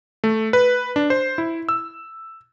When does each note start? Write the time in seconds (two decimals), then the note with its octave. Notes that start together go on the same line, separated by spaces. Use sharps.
0.24 A3
0.53 B4
0.96 D4
1.10 C5
1.38 E4
1.69 E6